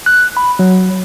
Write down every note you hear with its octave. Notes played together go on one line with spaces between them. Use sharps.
F#6
B5
F#3